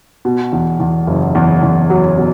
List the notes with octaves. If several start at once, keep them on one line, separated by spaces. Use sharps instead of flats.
B2
E2
E2
F#1
E2
E2
F#3
B2